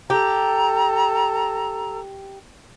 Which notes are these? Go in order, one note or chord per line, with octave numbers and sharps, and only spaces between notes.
G4 A4 A#5